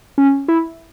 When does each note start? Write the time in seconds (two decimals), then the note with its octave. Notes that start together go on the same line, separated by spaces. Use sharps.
0.18 C#4
0.48 E4